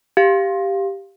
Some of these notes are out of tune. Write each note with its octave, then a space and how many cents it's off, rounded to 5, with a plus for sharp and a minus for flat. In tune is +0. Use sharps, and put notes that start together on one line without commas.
G4 +0 F5 +0